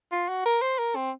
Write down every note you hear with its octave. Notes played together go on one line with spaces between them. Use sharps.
F4
F#4
A#4
C5
A#4
C4